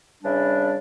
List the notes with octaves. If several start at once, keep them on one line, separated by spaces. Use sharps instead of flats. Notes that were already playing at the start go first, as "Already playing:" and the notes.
C#3 E3 G3 D4